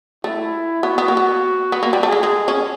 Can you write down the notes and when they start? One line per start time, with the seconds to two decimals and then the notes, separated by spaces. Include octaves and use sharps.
0.24 A3 E4
0.83 B3 F#4
0.98 B3
1.08 A#3
1.17 B3
1.72 B3
1.83 A#3
1.93 G3
2.03 A3 G#4
2.12 G#3
2.23 G#3
2.48 C#4